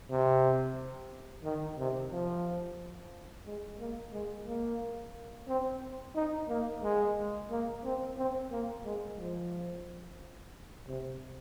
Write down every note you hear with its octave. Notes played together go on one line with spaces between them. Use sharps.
C3
D#3
C3
F3
G#3
A#3
G#3
A#3
C4
D#4
A#3
G#3
A#3
C4
C4
A#3
G#3
F3
C3